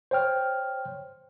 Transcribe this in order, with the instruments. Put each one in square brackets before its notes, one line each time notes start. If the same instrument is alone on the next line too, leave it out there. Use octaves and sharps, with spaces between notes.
[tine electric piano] C5 C#5 G5 F6